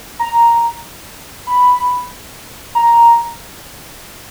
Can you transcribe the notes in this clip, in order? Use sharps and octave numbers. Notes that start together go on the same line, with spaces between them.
A#5
B5
A#5